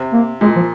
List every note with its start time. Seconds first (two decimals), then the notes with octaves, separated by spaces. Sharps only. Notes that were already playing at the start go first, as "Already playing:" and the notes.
Already playing: C3
0.13 A#3
0.41 A#2 G#3
0.56 F3